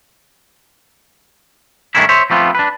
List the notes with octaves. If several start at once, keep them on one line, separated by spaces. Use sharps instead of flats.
G2 D#3 A3 C#4 D4 E4
C5 C#5 E5
F3 G3 A3 B3 C4 F4
D4 B4